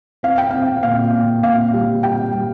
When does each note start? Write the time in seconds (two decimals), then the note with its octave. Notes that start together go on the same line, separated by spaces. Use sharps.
0.23 C4 F5
0.38 G5
0.51 C4 F5
0.83 A#2 F5
1.13 A#2
1.43 A#2 F5
1.73 G3
2.03 G3 G5
2.33 G3